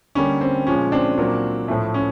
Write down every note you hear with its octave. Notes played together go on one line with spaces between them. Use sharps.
D3 G3 A#3 C#4
C4
A#2 F3 G#3 C#4
C4 D4
A#2 F#3 A#3
A2 F3 A3
C#4